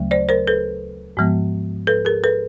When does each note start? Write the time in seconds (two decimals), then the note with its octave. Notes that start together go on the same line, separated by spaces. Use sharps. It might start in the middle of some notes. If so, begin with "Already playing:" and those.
Already playing: D2 C#3 F#3 A3
0.11 C5 D5
0.29 A#4 C5
0.47 A4 B4
1.17 G#2 F3 G#3 B3
1.87 A4 B4
2.05 G#4 A#4
2.24 A4 B4